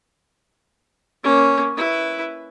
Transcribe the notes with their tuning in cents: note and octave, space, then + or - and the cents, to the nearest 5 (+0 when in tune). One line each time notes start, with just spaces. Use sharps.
A#3 +0 C#4 +0
E4 +0 B4 +0